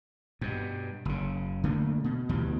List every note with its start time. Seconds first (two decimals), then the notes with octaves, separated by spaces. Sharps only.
0.41 G2 B2
1.05 F#1 C#3
1.64 D3 A3 A#3
2.04 B2
2.29 D2 B2 E3 G3